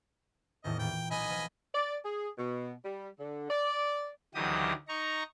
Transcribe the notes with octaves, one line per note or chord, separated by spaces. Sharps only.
G#1 E2 A2 D#5
A#2 G5
B1 D#5 G#5 B5
F3
D5
G#4
B2
G3
D3
D5
D2 D#3 E3 F#3 G4 D#6
D#4 A#5 C#6